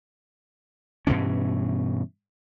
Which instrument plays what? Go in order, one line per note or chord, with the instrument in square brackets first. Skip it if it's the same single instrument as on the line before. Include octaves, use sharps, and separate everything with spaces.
[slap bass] G2 B2 E3 C#4